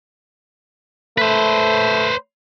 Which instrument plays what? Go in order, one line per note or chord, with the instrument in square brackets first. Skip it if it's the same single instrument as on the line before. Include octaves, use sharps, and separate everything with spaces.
[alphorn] A3 [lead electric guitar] B4 C5